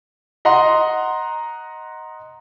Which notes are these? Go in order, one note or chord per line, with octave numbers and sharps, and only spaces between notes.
D#5 F#5 A#5 C6